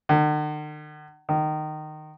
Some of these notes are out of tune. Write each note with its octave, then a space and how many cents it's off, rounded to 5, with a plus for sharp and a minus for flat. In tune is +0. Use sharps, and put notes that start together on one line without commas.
D#3 -45
D#3 -15